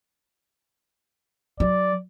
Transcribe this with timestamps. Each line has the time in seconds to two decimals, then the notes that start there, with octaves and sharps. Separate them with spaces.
1.60 F#3 D5